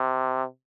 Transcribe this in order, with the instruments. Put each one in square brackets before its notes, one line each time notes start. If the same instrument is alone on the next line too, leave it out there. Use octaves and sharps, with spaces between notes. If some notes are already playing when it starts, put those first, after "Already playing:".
Already playing: [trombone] C3